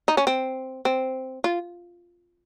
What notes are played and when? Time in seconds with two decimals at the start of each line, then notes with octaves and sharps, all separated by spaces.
0.08 D#4
0.17 C#4
0.27 C4
0.85 C4
1.44 F4